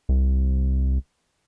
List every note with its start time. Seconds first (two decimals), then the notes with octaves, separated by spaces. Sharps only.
0.09 C2